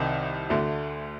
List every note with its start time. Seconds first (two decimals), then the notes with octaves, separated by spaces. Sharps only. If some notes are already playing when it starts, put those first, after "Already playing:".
Already playing: C2 C3 D#3
0.50 D2 D3 A3